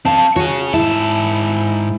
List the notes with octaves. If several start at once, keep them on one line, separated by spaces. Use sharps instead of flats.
C4 F5 A5
F#4 G#4 C#5
G#2 E4 A5